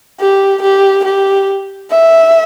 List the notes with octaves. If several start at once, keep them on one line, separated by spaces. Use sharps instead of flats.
G4
G4
G4
E5